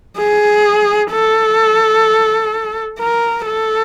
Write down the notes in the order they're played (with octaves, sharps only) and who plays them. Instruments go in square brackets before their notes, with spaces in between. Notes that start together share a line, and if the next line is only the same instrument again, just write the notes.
[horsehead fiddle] G#4
A4
A#4
A4